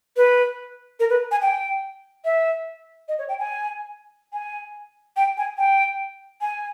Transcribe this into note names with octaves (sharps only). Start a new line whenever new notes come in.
B4
A#4
B4
G#5
G5
E5
D#5
C#5
G5
G#5
G#5
G5
G#5
G5
G#5